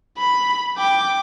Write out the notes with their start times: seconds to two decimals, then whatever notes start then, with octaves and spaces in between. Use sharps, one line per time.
0.18 B5
0.77 G5 D6